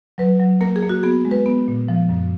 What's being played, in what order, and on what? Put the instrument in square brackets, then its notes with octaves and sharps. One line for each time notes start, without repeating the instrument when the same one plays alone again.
[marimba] F#3 B4
F#3
A#3 A#4
G#4
A#3
F#4
B3 G#4
G#3
B4
B3
A#2
F3
F#2